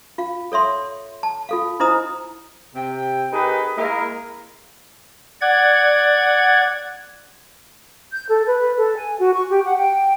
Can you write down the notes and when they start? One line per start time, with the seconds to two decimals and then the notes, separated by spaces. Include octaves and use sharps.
0.18 F4 F5
0.52 A4 C#5 E5 C6
1.23 A5
1.49 F4 A4 F5
1.80 D#4 E4 C5 D#5 A#5 D#6
2.75 C3 G5
3.32 D#4 G4 G#4 A#4 B4
3.77 G#3 A#3 E4 G#4 A#4
5.41 D5 F#5 G#6
8.11 G6
8.29 A4
8.46 B4
8.77 A4
8.96 G#5
9.19 F#4
9.33 C#6
9.50 G4
9.64 F#5
9.77 G5